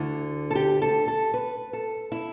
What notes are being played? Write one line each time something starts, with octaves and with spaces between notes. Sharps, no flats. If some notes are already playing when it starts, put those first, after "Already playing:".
Already playing: D2 D3 E4
A4
G4
A4
A4
B4
A4
E4